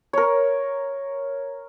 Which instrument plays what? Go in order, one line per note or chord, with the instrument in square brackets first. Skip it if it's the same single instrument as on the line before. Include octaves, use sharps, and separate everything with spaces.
[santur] A#4 C#5